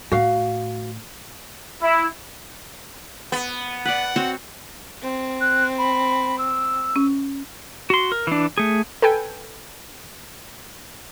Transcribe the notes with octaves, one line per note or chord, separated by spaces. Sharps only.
A2 F#4 F5
E4
B3
B4 D5 F#5
C4 F#4 C#5
C4
F#6
B5
E6
C#4
F#4 C6
A#4
E3 D4
A3 G#4
A4 B4 G5 G#5